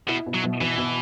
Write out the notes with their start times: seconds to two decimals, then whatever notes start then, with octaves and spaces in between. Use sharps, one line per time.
0.09 B2 E4
0.26 B2
0.34 F#3
0.43 B2
0.61 B2 E3
0.78 B2